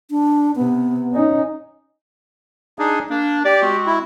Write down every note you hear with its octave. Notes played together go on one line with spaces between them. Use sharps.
D4
C3 B3
C#4 D#4
D4 D#4 G#4
A#3 D4
G4 D5
G#3 C4 F#4
E4